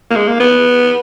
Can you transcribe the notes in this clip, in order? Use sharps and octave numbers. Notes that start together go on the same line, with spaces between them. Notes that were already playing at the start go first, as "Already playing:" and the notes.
A#3
G#3
A#3
B3